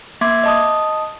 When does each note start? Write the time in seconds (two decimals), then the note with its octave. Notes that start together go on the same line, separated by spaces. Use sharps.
0.21 A#3 E5 C6 D6 G#6
0.44 D#5 A5 D#6